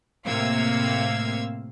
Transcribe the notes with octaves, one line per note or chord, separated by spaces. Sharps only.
A2 C3 A#3 F5 E6 G#6